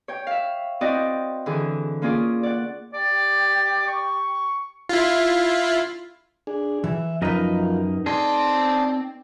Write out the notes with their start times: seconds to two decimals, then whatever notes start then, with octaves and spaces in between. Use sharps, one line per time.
0.08 C#5 G5
0.27 E5 F5
0.81 C4 E4 F#4 D5 D#5 G5
1.46 D3 E3 G#4 G#5
2.02 A#3 C#4 F4 G#4 D5
2.43 D5 F#5
2.94 G4 D5
3.87 C#6
4.89 E4 F4
6.47 D4 G#4
6.84 E3 E5
7.22 F#2 F3 D#4 A#4 B4 D#5
8.06 C4 G#4 D5 A5 C6